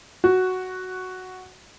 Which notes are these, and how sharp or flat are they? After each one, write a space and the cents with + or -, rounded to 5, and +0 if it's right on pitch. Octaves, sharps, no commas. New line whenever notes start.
F#4 +0